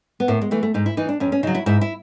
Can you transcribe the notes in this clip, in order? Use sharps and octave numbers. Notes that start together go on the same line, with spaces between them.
B3
A2 A#3
G#3
E3 A3
A3
G#2 D#4
E4
E3 D#4
D4
F2 C#4
C#4
C#3 F#3 D#4
E4
G#2 E4
E4